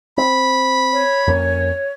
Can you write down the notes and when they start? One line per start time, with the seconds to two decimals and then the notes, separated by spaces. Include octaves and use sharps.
0.18 C4 B5
0.93 C#5
1.27 F2 A#3 C#4